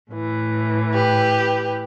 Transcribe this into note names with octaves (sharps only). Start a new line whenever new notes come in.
A2 E3
G4 B4